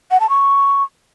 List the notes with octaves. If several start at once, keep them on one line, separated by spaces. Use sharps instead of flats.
F#5
A5
C#6